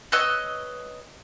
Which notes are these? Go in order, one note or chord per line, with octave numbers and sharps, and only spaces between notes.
B4 C#5 D#5 E6